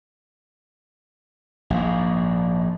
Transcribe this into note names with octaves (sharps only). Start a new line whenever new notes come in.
A#1 G#2